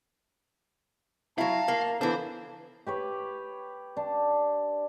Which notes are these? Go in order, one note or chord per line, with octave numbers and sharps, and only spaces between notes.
F#3 E4 F5 A5 A#5
A#3
E3 B3 D4 A4 C5
G4 B4 C#5
D4